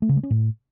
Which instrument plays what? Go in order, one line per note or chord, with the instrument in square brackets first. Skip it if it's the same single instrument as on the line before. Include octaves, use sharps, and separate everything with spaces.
[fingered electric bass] A3
C#3
G#3
C#4
A2